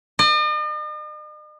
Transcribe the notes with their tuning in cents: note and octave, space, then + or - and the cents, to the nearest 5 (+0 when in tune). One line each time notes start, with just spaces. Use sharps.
D#5 -45